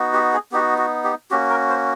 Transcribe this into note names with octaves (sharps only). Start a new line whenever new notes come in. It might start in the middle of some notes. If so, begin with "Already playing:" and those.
Already playing: B3 D#4 F#4
G4
G#4
B3 D#4 F#4 G4
F#4
G4
A#3 C#4 F#4 G4
A#4
C5